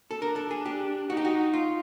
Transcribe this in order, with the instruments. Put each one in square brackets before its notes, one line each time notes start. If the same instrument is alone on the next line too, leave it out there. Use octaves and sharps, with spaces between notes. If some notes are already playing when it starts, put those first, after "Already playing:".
[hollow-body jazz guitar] A4
[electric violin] D4 [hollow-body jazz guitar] A#4
[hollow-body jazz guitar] A4
G#4
G4
[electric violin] D#4 [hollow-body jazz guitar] F#4
[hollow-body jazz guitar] G4
F#4
F4